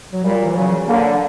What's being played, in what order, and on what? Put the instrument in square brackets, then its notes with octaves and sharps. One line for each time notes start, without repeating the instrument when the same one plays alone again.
[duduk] F#3
[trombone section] A#2 [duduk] G3
[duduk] E3
[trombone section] C#3 [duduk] F#3
[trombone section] D3 [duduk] A#3